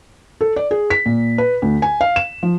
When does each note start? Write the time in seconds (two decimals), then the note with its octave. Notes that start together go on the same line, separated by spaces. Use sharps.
0.41 A4
0.56 D5
0.71 G#4
0.90 B6
1.06 A#2
1.38 B4
1.62 D2
1.82 G#5
2.01 F5
2.16 E7
2.43 F3